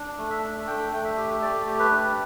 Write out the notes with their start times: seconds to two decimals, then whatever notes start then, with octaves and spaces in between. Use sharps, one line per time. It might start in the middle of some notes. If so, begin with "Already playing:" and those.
Already playing: D4
0.18 A3
0.30 E5
0.43 D4
0.67 A3 G5
0.92 A3 G5
1.05 E5
1.17 G4
1.42 A3 D5
1.67 G4
1.79 B4
1.91 D4